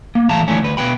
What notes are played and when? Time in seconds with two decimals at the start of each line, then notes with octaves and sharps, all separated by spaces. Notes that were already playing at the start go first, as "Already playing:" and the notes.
0.15 A#3
0.29 C2 A2 E3 F5 A5 A#5
0.48 D3 E3 F#3 A3 C#4
0.62 D2 B4
0.77 B2 A#3 B4 G5 B5